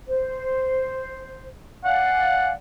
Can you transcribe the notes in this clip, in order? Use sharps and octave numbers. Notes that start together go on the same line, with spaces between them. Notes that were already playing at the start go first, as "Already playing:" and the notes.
C5
D5 F5 F#5 G#5